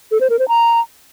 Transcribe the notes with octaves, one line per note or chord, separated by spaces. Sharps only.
A4
C5
A#4
C5
A#5